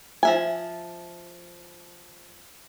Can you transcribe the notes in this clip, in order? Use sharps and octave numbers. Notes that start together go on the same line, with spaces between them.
F3 E5 G#5